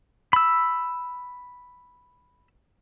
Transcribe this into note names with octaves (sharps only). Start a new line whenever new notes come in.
B5 E6